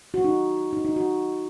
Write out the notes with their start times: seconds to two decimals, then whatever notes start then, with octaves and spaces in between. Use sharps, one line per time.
0.14 F#4
0.24 D#4
0.73 D#4
0.85 D#4
0.96 F#4